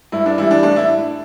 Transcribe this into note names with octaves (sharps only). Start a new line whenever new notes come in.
G2 E4
D4
E3 G3 E4
D4
A2 D4
E4